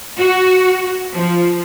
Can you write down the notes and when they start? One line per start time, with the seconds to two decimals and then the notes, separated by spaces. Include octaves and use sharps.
0.18 F#4
1.14 F3